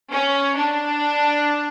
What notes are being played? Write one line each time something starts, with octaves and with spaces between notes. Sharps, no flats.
C#4
D4